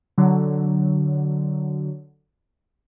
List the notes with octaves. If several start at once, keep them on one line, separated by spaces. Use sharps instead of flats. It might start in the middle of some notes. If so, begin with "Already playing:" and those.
D3 F#3